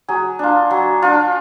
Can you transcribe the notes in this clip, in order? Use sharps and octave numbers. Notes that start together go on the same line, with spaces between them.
F#3 G#4
D4 F4
F#3
D4 F4